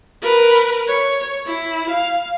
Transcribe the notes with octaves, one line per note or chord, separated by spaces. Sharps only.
A#4 B4
C#5
E4
F5